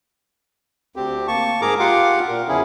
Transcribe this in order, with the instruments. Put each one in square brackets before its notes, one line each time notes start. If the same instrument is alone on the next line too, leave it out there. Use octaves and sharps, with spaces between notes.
[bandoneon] D2 C4 G4
A#3 A5 C#6
G#2 G#4 A#4 A#5 D6
F4 G4 F5 F#5 D6
A#2 A#4
E2 C#3 F3 C#4 E4 G#4